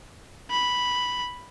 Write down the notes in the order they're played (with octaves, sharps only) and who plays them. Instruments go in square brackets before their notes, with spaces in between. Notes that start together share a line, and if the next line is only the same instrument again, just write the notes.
[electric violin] B5